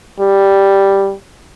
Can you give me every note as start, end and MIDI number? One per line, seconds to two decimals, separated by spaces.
0.20 1.13 55